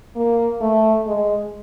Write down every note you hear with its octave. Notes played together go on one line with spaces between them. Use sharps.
A#3
A3
G#3